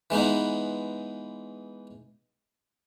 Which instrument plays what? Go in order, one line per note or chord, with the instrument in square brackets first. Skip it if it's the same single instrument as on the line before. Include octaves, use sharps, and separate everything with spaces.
[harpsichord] E3 G#3 B3 D#4